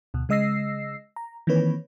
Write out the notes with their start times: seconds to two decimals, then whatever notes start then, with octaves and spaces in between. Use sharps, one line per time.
0.14 D2 B2
0.29 C#3 G#3 D#5 E6 A#6 C7
1.16 A#5
1.47 D#3 E3 A#3 C4 B4 C#5